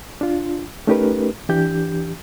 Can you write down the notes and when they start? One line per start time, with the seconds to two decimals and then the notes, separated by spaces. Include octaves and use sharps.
0.21 D4 F4
0.87 A3 C#4 D#4 G4 A#4 B4
1.49 E3 D4 G4 G6